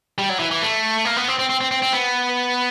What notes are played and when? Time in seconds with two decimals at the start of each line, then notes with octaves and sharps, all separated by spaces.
0.18 G3
0.29 F#3
0.39 E3
0.51 E3
0.62 A3
1.05 A#3
1.17 B3
1.28 C4
1.39 C4
1.49 C4
1.61 C4
1.71 C4
1.82 C4
1.93 B3